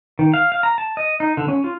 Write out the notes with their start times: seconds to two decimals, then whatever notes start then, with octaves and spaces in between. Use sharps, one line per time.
0.19 D#3
0.34 F5
0.52 F5
0.63 A#5
0.78 A5
0.97 D#5
1.20 D#4
1.37 D3
1.48 C#4
1.64 F4